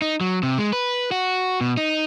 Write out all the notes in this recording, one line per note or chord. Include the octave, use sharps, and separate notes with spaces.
D#4
F#3
C3
G#3
B4
F#4
B2
D#4